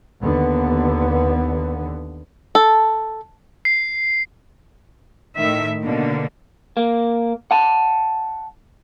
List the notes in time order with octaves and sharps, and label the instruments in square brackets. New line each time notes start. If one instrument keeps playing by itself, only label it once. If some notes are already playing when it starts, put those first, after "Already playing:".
[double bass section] D#2 D3 B3
[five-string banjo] A4
[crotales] C7
[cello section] A2 D#3 E5
B2 D3 A#3
[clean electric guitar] A#3
F#5 A5